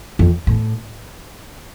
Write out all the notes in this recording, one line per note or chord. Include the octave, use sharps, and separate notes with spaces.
F2
A2